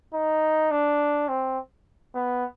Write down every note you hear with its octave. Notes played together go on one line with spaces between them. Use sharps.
D#4
D4
C4
B3